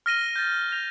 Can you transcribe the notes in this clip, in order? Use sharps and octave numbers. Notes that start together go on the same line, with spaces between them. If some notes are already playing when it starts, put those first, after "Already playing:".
F6 A#6 D#7 G7
G6 A6
G6 A#6 F7